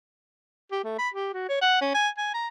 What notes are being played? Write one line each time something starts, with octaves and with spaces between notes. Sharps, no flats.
G4
A3
B5
G4
F#4
C#5
F#5
C#4
G#5
G#5
A#5